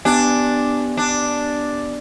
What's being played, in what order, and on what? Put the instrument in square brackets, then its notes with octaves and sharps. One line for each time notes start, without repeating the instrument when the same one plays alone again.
[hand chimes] B3 G4 G#5 [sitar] D4
[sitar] D4